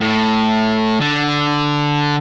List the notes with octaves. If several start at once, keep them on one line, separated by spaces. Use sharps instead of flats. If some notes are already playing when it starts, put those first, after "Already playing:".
A2
D3